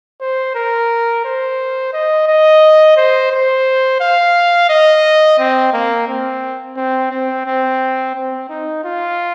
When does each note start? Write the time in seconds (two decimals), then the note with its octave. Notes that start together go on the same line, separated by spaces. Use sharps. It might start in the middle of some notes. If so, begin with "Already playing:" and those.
0.21 C5
0.55 A#4
1.25 C5
1.93 D#5
2.28 D#5
2.97 C5
3.32 C5
4.01 F5
4.70 D#5
5.39 C4
5.73 A#3
6.08 C4
6.77 C4
7.11 C4
7.46 C4
8.15 C4
8.49 D#4
8.84 F4